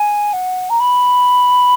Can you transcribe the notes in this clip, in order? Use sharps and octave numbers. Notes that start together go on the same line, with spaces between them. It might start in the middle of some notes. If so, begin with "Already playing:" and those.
Already playing: G#5
F#5
A#5
B5